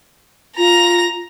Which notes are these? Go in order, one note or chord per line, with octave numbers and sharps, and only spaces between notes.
F4 A#5 A#6